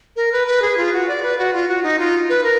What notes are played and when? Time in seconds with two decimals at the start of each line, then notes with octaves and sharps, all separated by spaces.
0.16 A#4
0.32 B4
0.47 B4
0.62 G#4
0.77 F4
0.93 F#4
1.08 D5
1.23 B4
1.38 F#4
1.53 F4
1.68 F#4
1.83 D#4
1.99 F4
2.29 B4
2.44 A#4